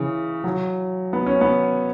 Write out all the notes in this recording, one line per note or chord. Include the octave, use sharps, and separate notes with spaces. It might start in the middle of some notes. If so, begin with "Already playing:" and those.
Already playing: C#3 E3
F#3
B3
C#4
B3